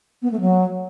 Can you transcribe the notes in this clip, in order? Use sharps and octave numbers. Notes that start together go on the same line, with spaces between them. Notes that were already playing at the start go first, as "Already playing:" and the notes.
B3
A3
F#3